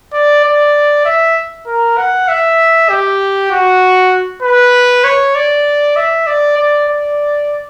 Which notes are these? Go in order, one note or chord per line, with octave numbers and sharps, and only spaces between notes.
D5
D5
E5
A#4
F#5
E5
G4
F#4
B4
C#5
D5
E5
D5
D5
D5